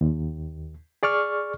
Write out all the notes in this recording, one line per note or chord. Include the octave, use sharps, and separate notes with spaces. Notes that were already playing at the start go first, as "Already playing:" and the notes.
D#2
G#4 D5 C#6 F6